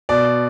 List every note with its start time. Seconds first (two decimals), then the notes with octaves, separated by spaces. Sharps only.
0.09 B2 D5